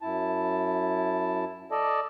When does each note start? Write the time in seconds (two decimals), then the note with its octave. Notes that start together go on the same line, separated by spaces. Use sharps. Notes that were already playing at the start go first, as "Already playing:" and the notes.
0.02 F#2 E4 A5
1.71 A4 D5 D#5 A5